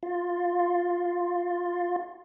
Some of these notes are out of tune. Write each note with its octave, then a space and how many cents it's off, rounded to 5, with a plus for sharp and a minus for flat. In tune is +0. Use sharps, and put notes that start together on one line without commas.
F4 +10